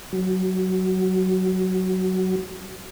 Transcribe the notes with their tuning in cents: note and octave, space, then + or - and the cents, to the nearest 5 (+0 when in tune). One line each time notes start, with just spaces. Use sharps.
F#3 +10